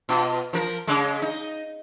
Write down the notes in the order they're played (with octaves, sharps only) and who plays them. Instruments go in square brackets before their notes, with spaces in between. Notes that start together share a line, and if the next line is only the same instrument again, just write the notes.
[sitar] B2 F4
F3 A#4
C#3 G#3
D#4